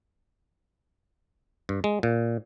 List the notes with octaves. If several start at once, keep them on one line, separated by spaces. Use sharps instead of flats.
G2
G#3
A#2